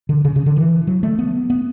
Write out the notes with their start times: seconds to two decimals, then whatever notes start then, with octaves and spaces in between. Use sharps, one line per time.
0.09 D3
0.25 C#3
0.36 C#3
0.46 D3
0.56 E3
0.87 F#3
1.03 A3
1.19 B3
1.50 B3